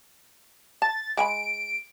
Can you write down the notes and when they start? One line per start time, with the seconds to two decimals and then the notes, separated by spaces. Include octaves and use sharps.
0.82 A5 A6
1.17 G#3 G#5 B5 D7